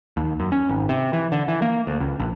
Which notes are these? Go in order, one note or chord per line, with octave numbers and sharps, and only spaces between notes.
D#2
F#2
C#4
G#1
C3
E3
D3
E3
A#3
D2
C#2
A#1